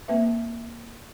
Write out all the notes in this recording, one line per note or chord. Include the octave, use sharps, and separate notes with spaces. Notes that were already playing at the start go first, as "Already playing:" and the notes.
A#3 C4 B4 E5